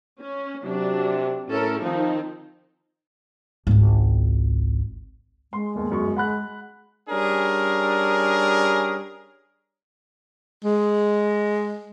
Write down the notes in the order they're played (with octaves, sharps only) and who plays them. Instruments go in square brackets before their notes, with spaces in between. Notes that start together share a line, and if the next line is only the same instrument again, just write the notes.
[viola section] C#4
[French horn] C3 [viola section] F#3 D4
[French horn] A2 [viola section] C#4 A4 A#4
[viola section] D#3 C4 D#4 [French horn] F3
[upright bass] G#1 C#2
[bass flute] G#3 [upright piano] C6
[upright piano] G1 D#2
G1 F#2 C#6
F#5 B5 F#6
[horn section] G3 C#4 D4 G#4 A#4
[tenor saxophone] G#3